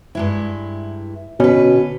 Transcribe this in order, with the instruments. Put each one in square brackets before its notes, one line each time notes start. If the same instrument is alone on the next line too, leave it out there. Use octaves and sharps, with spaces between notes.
[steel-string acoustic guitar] G2 G#3 E4
[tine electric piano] B2 C#4 [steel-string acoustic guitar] D3 B4 [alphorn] F#4